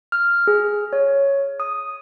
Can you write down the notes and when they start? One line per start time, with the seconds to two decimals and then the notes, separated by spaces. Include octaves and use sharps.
0.12 F6
0.47 G#4
0.93 C#5
1.60 D#6